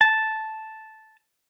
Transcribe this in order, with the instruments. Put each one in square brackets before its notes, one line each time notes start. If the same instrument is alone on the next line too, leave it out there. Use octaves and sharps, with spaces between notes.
[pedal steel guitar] A5